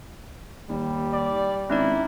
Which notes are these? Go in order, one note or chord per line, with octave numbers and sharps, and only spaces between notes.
D#2 G3
D5
G#1 C#4 D#4 E4 D5